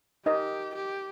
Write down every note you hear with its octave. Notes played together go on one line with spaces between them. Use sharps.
D#4 G4 A#4 D#5
G4